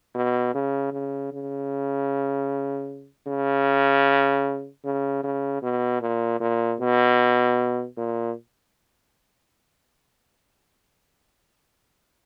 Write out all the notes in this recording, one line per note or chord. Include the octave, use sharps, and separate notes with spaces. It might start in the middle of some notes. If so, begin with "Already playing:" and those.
B2
C#3
C#3
C#3
C#3
C#3
C#3
B2
A#2
A#2
B2
A#2